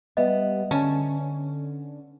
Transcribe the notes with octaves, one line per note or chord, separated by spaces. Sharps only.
G3 B3 D#5 E5
D3 C#4 A5